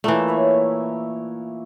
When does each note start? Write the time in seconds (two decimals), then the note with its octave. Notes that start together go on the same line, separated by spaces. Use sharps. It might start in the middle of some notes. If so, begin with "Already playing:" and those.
0.04 A#2 E3 A3 E5 A#5
0.28 E4 C#5